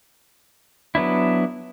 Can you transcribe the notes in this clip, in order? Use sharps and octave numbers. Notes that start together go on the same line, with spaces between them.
F#3 B3 D4 E4